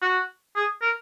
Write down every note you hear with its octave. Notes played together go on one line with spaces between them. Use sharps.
F#4
G#4
A#4